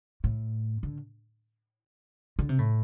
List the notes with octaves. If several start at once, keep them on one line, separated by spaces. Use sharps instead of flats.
A2
D3
D3
C3
A2